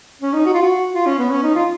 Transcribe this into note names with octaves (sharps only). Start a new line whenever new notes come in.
C#4
D#4
F#4
F4
F#4
F4
C#4
B3
C#4
D#4
F4